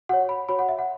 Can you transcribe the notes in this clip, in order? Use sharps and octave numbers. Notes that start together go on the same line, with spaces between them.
F#4 C#5 F#5
B5
F#4 C#5 B5
F#5
E5
F#5